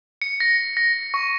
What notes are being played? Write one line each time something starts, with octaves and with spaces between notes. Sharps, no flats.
C#7
A#6
A#6
C#6